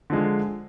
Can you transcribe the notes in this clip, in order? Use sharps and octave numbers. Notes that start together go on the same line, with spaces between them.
D3 F3 G#3